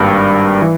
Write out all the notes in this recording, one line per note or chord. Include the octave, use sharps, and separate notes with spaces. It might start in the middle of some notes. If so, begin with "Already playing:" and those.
Already playing: G#1 G2 G3 A#3
E3